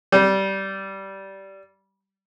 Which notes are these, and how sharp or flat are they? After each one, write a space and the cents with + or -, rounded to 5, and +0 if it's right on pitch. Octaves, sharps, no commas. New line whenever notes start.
G3 -15